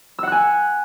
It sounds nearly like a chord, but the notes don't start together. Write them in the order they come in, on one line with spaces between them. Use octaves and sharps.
E6 F#5 F#6 G#5